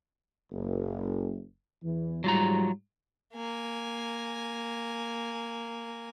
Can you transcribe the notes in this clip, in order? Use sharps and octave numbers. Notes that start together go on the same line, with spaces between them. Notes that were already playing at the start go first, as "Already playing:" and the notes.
F#1
E2 E3
G#2 F#3 G3 F4 A#5
A#3 G#5